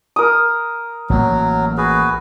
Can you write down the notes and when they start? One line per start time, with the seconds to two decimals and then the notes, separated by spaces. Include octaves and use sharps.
0.16 A#4 D#6
1.10 A1 F#3 A#3
1.77 F#4 G#4 B4